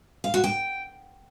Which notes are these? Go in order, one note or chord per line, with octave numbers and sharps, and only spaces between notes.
F5
F#4
G5